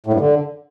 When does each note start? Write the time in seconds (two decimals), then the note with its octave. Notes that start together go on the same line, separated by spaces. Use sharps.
0.06 A2
0.13 G2
0.20 D3